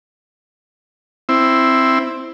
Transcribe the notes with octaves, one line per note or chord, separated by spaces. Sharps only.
C4 E4